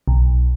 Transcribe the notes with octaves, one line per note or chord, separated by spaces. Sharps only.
B1